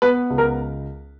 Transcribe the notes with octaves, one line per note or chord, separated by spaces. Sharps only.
B3 B4
C#2
A#4